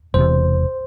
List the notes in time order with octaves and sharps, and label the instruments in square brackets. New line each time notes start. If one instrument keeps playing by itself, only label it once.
[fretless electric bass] E1 E2 C3 [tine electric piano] C5